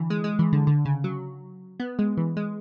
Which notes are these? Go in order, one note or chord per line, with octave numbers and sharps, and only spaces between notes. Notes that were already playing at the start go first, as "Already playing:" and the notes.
Already playing: D3 E3
G#3
G#3
E3
D3
D3
C#3
F#3
B3
G#3
E3
G#3